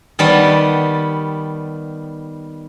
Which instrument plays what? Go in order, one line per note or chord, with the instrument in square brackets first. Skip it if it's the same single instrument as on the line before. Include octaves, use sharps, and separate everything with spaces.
[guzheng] D#3 G3 B3 A5 B5